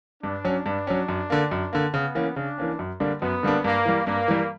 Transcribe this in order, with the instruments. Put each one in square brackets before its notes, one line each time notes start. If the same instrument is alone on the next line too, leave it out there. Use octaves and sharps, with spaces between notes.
[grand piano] G2 [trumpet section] D4
[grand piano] F#3 C#4
[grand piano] G2 [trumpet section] D4
[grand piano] F#3 C#4
F#2
D3 A#3
F#2
D3 A#3
[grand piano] C#3 [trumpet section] B3
[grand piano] E3 A#3 C#4
[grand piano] C#3 [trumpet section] D4
[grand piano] E3 A#3 C#4
F#2
D3 G3 A#3 D4
[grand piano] F#2 [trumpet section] B3
[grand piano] D3 G3 A#3 D4
[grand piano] G2 [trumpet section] A#3
[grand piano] E3 G3
[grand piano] G2 [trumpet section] A#3
[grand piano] E3 G3